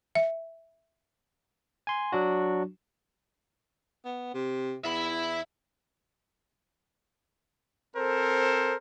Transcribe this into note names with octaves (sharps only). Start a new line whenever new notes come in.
E5
G#5 C6
F#3 D4 F#4
B3
C3
E2 E5 B5
C4 A4 A#4 C5